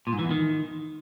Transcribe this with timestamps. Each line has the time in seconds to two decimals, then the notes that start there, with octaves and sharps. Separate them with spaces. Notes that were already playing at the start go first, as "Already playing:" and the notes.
0.07 A#2
0.13 G#2
0.19 E3
0.25 E2
0.31 D#3